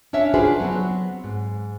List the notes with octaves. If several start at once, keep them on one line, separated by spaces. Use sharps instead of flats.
C#4 D4 C#5 E5
D4 F4 F#4 G#4 B4 C5
F#3 B3 C4
G#2